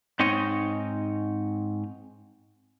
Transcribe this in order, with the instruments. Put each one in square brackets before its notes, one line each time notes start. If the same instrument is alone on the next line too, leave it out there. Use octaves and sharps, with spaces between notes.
[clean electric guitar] G#2 C4 D#4 C#5 D#5